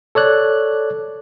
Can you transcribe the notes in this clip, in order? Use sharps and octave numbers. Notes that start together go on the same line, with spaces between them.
A4 C#5 D5 F#6